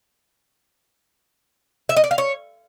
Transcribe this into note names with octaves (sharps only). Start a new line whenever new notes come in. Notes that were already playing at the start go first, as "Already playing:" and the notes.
E5
D#5
D5
F5
C#5